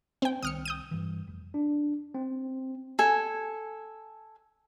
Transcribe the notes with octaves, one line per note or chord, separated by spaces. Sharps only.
C4 G5
C2 D#3 D#6 F6 C#7
D#6 G6 D#7
G2 E3
F1
D4
C4
A4 G#5